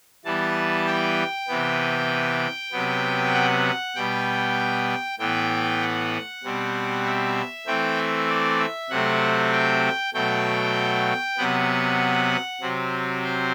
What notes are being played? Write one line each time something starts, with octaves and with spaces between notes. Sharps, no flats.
E3 G3 B3 A5
G5
C3 E3 B3
C3 F#3 B3
F#5
B2 G3 B3 G5
A2 E3 B3 G5
F#5
B2 G3 C4
E5
E3 A3 C4 G5
E5
D5
E5
C3 F#3 A3 C4 F#5
G5
B2 F#3 A3 G5
C3 F#3 B3 F#5
C3 F#3 C4
C5